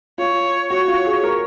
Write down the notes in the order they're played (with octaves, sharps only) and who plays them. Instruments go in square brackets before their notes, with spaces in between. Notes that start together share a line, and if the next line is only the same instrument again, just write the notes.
[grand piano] F4 [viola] C#5
[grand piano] F#4 [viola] C#5
[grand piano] F4
G#4
A#4